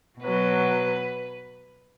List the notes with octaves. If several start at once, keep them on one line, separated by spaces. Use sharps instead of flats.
B2 F#3 B4